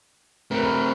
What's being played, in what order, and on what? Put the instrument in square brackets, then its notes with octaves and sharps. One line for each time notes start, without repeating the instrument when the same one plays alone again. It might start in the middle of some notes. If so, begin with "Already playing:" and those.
[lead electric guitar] A3 C4 [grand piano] A#4 B4